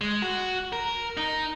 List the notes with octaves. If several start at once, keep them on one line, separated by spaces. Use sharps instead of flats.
G#3
F#4
A#4
D#4